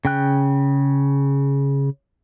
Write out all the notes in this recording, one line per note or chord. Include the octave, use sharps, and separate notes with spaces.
C#3 G5 F#6